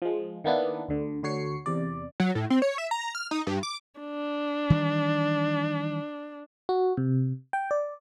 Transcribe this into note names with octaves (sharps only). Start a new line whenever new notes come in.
F3 G#3
D#3 A#3 B3 D4 E4
D2 D3
D2 D3 F#4 C#5 C7 C#7
E2 C3 D5
F#3
A2
C4
C#5
E5
A#5
F6
D#4
G2
D6
D4
D#3 E3 G3
F#4
C3
G5
D5